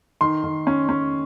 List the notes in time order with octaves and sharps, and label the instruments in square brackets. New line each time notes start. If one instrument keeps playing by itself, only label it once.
[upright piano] D#3 C6
D#3
C#4
C#4